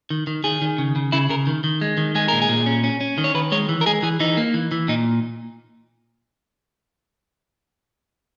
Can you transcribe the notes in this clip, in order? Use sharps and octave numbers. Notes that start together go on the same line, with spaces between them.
D#3
D#3
D#3 G#4
D#3
C#3
C#3
C#3 E4
C#3 A#4
D#3
D#3
G#3
D#3
G#3 G#4
A#2 A#4
G#4
A#2
C#4
C#4
C#4
D#3
C#5
D#3 B4
G#3 C#5
E3
A#4
G#3 G#4
E3 G#4
E3 D#4
A#3
E3
E3
A#2 D#4